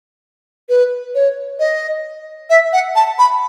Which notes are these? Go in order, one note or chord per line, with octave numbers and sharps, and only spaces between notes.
B4
C#5
D#5
E5
F#5
A5
B5